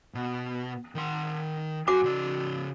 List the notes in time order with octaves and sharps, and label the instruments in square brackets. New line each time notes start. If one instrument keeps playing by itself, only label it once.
[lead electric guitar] B2
D#3 C6
[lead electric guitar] F#2 G#5 [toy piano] F#4 D6
[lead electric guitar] C#3 D5